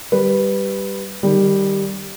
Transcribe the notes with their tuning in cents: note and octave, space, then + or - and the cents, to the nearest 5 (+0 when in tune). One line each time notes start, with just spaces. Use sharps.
G3 +0 B4 +0
D#3 -15 G3 +0